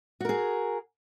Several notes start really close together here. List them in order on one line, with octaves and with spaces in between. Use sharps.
F#4 A#4 G#4